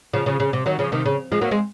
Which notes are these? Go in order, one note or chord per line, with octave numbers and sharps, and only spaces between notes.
C#3 F3
C#3 F3
C#3
C3
D#3 F#3
C#3 F3
C3 D#3
C#3
F3 G#3
F#3 A#3
G#3 C4